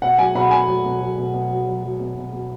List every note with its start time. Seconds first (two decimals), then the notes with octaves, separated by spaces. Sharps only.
0.02 B2 F#5
0.18 F#3 G#5
0.35 B2 F#5 B5
0.51 B2 G#5
0.67 F#3
0.85 B2
1.01 F#3
1.18 B2
1.34 B2
1.51 F#3
1.66 F#3
1.84 F#3
2.00 B2
2.17 B2
2.33 B2